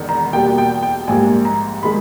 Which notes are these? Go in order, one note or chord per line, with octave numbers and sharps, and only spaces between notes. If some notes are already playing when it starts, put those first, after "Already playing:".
Already playing: E1 E2 D#3 B3
A#5
E2 B2 G3 A#3 G5
G5
G5
A#1 G#2 G3 A#3 G#5
A#5
D#3 G#3 B5